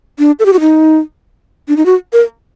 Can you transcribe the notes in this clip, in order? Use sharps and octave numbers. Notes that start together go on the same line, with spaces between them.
D4
A4
G4
F#4
D#4
D4
D#4
F#4
A#4